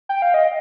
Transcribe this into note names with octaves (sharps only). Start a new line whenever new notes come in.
G5
F5
D#5